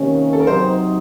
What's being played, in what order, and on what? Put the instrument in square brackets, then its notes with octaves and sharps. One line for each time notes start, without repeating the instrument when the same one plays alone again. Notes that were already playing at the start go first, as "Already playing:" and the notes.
Already playing: [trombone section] C3 D#3 A#3 C#4
[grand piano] A4
A#4
[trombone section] C3 F#3 C4 D#4 [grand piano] C5